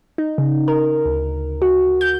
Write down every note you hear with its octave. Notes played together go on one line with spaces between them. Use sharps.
D#4
C#3
A#4
D2
F#4
G6